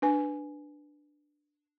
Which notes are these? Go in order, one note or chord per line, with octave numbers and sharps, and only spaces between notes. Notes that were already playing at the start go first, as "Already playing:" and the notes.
D4 B4 G#5